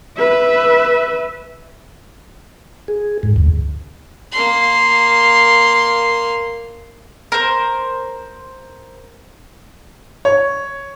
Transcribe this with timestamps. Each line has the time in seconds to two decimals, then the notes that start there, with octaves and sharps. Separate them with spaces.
0.17 B4 E5
2.88 G#4
3.23 G#2
3.36 D2
4.32 A#3 C6
7.32 A#4 C5
10.25 C#5